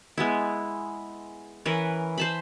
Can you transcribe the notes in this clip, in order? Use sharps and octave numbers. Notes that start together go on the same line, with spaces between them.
G#3 B3 E4
E3 C#4 A#4 B4
C5 A5 B5